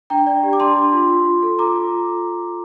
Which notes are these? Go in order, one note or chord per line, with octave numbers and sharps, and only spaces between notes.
D4 G5 A#5
D5
G4
D6
D4 A5 C6
D4
F4
F4
F4
A4
F4 A#5 D6
F4